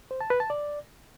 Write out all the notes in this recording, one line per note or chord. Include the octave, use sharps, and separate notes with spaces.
C5
A5
B4
A5
D5